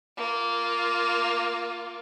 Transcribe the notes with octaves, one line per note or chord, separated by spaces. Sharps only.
A#3 F4